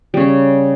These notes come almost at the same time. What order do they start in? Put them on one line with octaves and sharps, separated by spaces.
G3 C#3 C#4